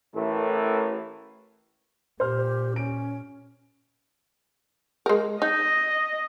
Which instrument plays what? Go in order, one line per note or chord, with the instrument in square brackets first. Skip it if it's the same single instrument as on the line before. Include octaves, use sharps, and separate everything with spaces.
[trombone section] A1 A2 E3 A3 A#4
[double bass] A#2 [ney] G4 [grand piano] C5 F6
[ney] C#4 [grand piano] D7
[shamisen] G#3 A#4
[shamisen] D#4 [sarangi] D#5